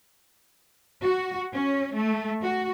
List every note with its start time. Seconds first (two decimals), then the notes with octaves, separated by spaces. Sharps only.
1.02 F#4
1.52 C#4
1.93 A3
2.41 F#4